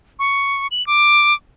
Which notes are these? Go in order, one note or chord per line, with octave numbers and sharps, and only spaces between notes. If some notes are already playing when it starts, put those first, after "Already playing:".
C#6
F#7
D6